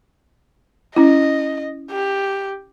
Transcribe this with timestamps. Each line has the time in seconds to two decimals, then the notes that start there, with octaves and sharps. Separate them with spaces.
0.96 C#4 E4 D#5
1.91 G4